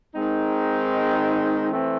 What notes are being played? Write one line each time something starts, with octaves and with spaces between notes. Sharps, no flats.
D#3 G#3 C4 D#4
E3 A3 C4